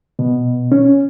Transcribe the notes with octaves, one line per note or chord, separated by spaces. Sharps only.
B2
C#4